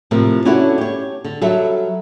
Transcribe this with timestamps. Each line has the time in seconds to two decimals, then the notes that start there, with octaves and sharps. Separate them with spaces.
0.11 A2 C3 F3 A#4
0.45 C#4 D4 E4 F#4 A4 C#5
0.78 G4 C#5
1.25 D3
1.42 F#3 G3 A4 E5